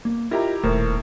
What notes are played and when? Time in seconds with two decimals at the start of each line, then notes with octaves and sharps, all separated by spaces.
0.05 A#3
0.31 E4 F4 G4 A#4 D#5 A#5
0.63 D#1 A2 A3 A#4 C5